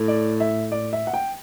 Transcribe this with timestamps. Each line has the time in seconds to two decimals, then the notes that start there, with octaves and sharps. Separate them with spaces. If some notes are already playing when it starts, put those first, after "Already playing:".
Already playing: A2
0.08 D5
0.40 E5
0.72 D5
0.93 E5
1.07 F#5
1.13 G5